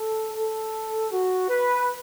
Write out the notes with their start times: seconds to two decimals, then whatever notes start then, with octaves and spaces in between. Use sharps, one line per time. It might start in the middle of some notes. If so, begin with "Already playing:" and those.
Already playing: A4
0.34 A4
1.11 F#4
1.49 B4